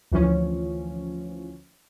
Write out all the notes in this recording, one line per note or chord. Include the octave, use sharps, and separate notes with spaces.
D2 E3 F3 C#4